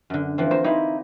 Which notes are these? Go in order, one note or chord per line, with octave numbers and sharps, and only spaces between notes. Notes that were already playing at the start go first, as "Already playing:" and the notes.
F#2 D3
E3 F3 C4
A#3 C5
D#4 E4 G4 C5